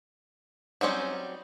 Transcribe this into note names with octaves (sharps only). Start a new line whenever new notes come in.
F#3 G3 C4 C#4 D#4